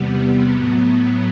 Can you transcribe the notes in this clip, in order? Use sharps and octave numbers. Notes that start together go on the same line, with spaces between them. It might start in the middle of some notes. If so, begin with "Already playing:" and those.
Already playing: E2 C3 G3 B3
A2 F#3 B3